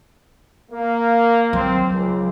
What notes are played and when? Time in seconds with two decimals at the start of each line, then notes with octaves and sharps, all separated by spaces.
0.70 A#3
1.53 F#3 C4
1.91 C#2